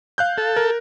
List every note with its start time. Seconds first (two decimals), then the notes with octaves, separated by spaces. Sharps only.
0.18 F5 F#6 G6
0.38 A4
0.56 A#4